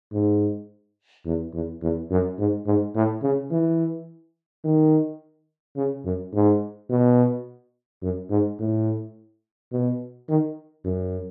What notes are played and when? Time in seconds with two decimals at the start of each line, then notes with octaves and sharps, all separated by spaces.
0.12 G#2
1.26 E2
1.54 E2
1.82 E2
2.10 F#2
2.39 G#2
2.66 G#2
2.95 A2
3.23 C#3
3.51 E3
4.65 D#3
5.77 C#3
6.05 F#2
6.34 G#2
6.90 B2
8.02 F#2
8.30 G#2
8.59 A2
9.72 B2
10.29 D#3
10.85 F#2